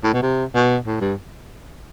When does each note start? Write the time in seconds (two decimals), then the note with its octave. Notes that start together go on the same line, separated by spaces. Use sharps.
0.04 A2
0.13 B2
0.22 C3
0.55 B2
0.86 A2
1.01 G2